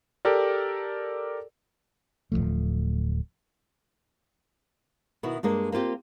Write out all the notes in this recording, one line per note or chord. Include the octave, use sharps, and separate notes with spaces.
G4 A4 A#4 D5
D1 B1 F3 A3
B2 D#3 E4 F#4
G2 G#3 A#3 D4
A#3 C4 F4 G4